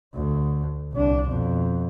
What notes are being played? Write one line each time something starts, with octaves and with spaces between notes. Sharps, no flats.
D2
C2 D4
F2 B2